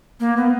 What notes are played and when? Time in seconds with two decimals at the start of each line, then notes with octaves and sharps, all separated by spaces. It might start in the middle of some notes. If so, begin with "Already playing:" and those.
0.20 A#3
0.37 B3